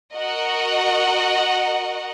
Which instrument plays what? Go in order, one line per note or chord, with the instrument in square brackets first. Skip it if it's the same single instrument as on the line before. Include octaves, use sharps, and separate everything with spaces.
[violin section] F#4 A#4 D#5 F#5